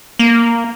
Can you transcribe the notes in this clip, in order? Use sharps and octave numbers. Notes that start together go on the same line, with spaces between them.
A#3